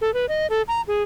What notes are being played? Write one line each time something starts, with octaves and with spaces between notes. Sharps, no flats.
A4
B4
D#5
A4
A#5
G#4